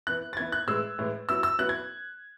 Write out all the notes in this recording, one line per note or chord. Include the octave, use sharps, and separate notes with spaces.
E3 B3 E4 F#6
A6
E3 B3 E4 G#6
F#6
A2 E3 G#3 E6
A2 E3 G#3
F#3 B3 E4 E6
E6
F#3 B3 E4 F#6
G#6